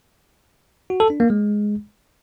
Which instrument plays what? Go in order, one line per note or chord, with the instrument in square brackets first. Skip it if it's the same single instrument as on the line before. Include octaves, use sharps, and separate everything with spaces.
[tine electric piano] F#4
A4
D4
A#3
G#3